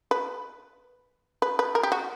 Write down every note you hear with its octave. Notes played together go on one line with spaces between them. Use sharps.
B4
B4
B4
A#4
G4
F#4